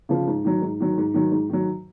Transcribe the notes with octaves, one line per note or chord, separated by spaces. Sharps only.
C#3 F3
G#2
D#3 F#3
G#2
D#3 F#3
G#2
D#3 F#3
G#2
D#3 F#3